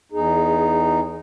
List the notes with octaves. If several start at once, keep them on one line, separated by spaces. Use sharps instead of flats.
E2 D#4 G#4